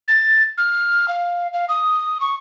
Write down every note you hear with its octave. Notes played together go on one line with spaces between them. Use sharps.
A6
F6
F5
F5
D#6
C#6